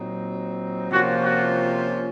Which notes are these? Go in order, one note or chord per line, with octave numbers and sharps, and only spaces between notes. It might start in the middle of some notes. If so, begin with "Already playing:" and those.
Already playing: A#2 F#3 C4 D#4
C3 F3 A#3 C#4 F4 F#4
F#4